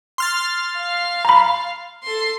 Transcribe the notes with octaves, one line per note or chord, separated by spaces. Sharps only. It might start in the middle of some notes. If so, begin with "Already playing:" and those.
C6 F6 A6
F5
A#5 B5
A4 C6